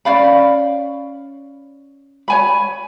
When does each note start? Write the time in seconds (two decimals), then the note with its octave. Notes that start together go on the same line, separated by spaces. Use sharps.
0.05 C#4 D5 F5 B5
2.28 C#5 G#5 B5